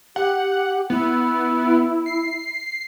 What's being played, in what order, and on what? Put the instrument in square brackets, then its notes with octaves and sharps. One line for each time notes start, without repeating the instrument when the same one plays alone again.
[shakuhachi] G4 [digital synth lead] F#5
[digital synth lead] B3 [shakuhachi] E4
[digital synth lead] C7